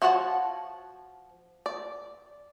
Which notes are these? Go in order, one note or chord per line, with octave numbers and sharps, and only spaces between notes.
F3 F#4 C#5 F#5 A5
D5